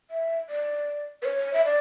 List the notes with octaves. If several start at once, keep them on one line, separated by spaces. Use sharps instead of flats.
E5
D5
B4
C#5
E5
D5